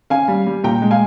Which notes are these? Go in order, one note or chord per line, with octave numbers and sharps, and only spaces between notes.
C#4 F5 G#5
G3
G3
A#2 G5 A#5
G#3
F5 G#5